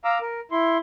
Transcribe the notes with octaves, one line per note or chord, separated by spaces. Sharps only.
F5 A#5 D6 E6
A#4
E4 C6